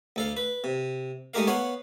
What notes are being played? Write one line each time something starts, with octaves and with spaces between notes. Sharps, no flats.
D2 A4 F5
B4
C3
G#3 A3 D#4 G4 A#4 F5
B3 C#5 F5 F#5